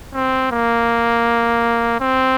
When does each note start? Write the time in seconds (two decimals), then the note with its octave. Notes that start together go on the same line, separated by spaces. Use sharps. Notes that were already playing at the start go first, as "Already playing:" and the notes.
0.14 C4
0.51 A#3
2.00 C4